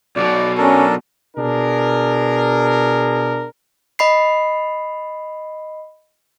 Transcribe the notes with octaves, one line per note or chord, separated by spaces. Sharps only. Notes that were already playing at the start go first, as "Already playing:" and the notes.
B1 B2 D5
C#4 D4 A4 A#4
B2 D4 G#4 A#4
D#5 B5 C7